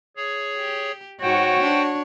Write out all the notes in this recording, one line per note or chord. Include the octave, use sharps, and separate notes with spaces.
G#4 C#5
G4
G#2 F#4 C5 C#5 G5
D4